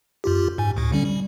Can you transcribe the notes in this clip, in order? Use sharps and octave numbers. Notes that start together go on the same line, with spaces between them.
F#2 F4 G4
G#2 G#5
D2 A2
D3 G3 C#4
G3